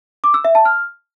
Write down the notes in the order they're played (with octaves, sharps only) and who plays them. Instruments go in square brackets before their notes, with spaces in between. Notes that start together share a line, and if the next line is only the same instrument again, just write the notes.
[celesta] D6
E6
E5
A5
F6